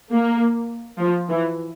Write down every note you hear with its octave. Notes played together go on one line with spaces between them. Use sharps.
A#3
F3
E3